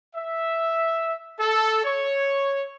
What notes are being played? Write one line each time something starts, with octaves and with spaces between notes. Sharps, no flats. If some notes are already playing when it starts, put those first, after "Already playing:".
E5
A4
C#5